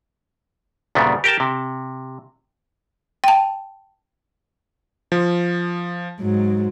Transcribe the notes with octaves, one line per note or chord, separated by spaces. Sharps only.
D2 A#2 C#3 G3 B3
G4 A#4 G5 A5
C3
G5 A5
F3
G#2 F#3